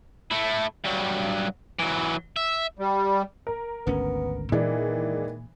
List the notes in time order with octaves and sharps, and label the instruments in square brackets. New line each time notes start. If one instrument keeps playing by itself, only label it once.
[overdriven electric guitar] A3 E4
G2 F#3
E3 F#3
E5
[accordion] G3
[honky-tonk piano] A#4
[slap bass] G#1 D2 C#4 [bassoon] B3
[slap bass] A#2 [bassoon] D#3 [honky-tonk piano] E3 G#3 D4